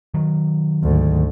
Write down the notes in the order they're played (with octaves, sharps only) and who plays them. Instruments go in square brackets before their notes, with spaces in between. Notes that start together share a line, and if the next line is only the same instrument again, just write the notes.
[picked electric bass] D#3 F#3
[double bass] D2 G#2